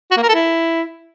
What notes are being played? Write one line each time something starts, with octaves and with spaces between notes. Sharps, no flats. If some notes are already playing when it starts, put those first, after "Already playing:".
F#4
A#3
A#4
A4
E4